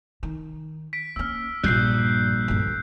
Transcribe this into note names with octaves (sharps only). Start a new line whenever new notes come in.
D#3
B6 D7
A#3 C#4 E6 F6
A#1 G2 A#2 G3 F#6 G6 C7
D2 G2